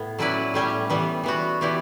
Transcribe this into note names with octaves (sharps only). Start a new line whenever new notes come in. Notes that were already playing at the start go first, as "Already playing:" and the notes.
Already playing: A2 B3
F#3 C#4 E4 B4 D5
A2 G3 C#4 G4
E3 G3 B3
E3 B3 F#4
E3 B3 E4 G4 D5